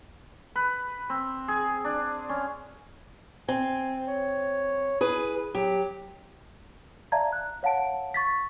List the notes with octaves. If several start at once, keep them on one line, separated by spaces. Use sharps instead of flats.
B4
C4
G#4
D4
C#4
C4 G#5
C#5
E4 G#4 B4
F#3 G4
D5 E5 F5 A5 A#5 G#6
F#6
C#5 F5 F#5 A5 D7
C#6 A6 B6